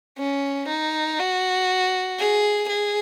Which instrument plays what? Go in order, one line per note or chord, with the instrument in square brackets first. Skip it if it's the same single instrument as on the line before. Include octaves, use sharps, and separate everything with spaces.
[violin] C#4
D#4
F#4
G#4
G#4